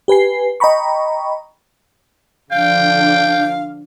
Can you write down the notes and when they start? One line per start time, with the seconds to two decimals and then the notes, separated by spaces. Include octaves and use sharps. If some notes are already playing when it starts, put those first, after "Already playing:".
0.08 G4 B4 G#5 C7
0.60 D#5 G5 A#5 B5 C#6
2.51 D3 F3 D4 F5 G5